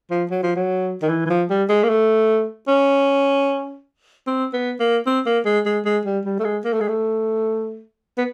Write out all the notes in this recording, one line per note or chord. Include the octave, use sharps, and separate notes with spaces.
F3
F#3
F3
F#3
D#3
E3
E3
F3
G3
G#3
A#3
A3
C#4
C4
B3
A#3
C4
A#3
G#3
G#3
G#3
G3
G3
A3
G#3
A#3
A3
G#3
A3
B3